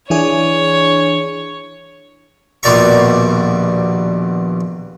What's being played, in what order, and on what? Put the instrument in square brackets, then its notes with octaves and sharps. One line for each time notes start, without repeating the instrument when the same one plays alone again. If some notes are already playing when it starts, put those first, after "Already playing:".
[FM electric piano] E3 D4 G#4 [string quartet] C#5
[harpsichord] A#1 D#2 B2 D5 A#5 C#6